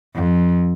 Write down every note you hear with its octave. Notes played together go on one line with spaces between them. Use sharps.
F2